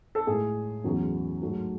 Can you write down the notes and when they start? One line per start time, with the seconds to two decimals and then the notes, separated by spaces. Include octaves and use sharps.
0.15 A4
0.27 A2 G#3 G#4
0.84 E2 C#3 F#3 A3
1.41 G#2 F#3 A3